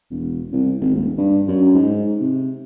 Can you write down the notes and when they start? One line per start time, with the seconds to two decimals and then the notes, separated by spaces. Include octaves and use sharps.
0.11 E1
0.52 C2
0.81 G#1
0.94 D#1
1.18 G2
1.48 F#2
1.74 G#2
2.20 C3